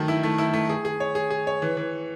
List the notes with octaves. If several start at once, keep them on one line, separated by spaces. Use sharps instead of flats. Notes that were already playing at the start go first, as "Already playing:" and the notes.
Already playing: D#3 F#3 A3
E4
A3
E4
A3
G#4
G#4
C#5
G#4
G#4
C#5
E3
E3